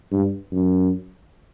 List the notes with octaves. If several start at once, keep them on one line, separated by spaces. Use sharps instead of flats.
G2
F#2